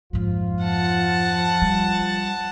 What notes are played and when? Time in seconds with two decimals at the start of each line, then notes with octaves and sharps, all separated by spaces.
0.13 F2 G#2 F3 F4
0.64 F#5 A5
1.62 G3